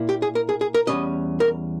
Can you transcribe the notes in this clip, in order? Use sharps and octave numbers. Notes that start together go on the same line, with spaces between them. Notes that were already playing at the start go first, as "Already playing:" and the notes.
Already playing: A#2 A#3 E4
G4
G#4
A#4
G#4
G#4
A#4
E2 C#3 G3 C#4 D#5
A#4